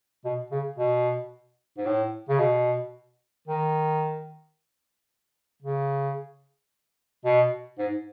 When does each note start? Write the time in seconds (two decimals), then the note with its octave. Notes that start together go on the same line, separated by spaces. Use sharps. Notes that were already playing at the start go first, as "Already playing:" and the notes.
0.25 B2
0.52 C#3
0.78 B2
1.78 G#2
1.86 A2
2.29 C#3
2.39 B2
3.47 D#3
5.63 C#3
7.25 B2
7.79 G#2